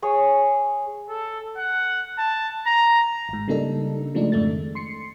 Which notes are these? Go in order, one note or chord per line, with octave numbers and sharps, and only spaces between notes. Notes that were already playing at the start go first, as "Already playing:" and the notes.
G#4 C#5
A4
F#5
A5
A#5
G#1 G#2
C#3 G3 A#3 D4 D#4 A4
C#3 F3 G#3 A3 D4 D#4
F2 G#2 A3 D4 A6
D#3
C6 C7 C#7